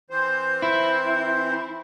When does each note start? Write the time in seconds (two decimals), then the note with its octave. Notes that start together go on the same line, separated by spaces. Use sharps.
0.10 E3 C4 C5
0.62 E4